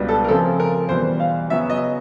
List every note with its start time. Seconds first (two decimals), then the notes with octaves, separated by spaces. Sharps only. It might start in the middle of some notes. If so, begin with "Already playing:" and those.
Already playing: C#2 B2 G3 B3 D4
0.09 A4
0.24 A#4
0.28 C#3 F3 A3 C4 F4 A4
0.60 A#4
0.89 E2 B2 G3 C5
1.20 F5
1.50 C#3 F#3 B3 E5
1.70 D#5